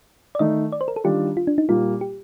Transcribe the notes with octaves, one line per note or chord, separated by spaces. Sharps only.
D5
D#3 A3 D#4 D#5
D5
C5
A#4
A4
D#3 G3 D4 F4 G4
F4
D4
D#4
A#2 G3 A#3 F4
G4